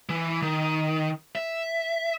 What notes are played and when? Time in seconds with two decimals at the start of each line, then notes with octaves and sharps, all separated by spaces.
0.09 E3
0.42 D#3
1.35 E5